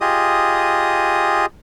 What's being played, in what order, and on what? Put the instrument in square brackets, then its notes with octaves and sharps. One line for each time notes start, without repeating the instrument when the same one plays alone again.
[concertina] F4 G4 G#4 D#5 D#6